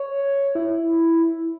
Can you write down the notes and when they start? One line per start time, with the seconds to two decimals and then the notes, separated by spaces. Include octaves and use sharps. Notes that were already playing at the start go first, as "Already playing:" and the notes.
Already playing: C#5
0.55 E4